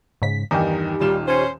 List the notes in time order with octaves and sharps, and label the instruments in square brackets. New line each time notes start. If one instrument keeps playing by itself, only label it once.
[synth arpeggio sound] G#2 C#3 B6
[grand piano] E2 G2 D#3 [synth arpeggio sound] D#4 G4
[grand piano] D#1 F4 E7 [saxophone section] G3
[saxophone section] C#4 C5